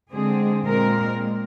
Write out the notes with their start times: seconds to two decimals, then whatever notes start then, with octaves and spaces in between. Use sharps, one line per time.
0.11 D3 G#3 C4 G#4
0.65 A#2 G#3 C4 A#4